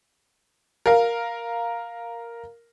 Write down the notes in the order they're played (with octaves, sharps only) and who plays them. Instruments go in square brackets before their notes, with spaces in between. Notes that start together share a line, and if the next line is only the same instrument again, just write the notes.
[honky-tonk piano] A#4 F5